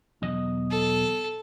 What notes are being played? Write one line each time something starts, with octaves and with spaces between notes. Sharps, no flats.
B1 E2 D#5
A4